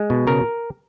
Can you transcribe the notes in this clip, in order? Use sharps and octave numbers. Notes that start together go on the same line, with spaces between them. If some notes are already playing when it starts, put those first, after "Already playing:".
Already playing: G#3
B2
C#3 A#4